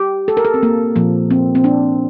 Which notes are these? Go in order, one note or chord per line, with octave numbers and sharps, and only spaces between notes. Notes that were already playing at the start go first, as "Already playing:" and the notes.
Already playing: G4
A4
A#4
A4
C4
A#3
A#2 F3 A#3
C4
C4
D4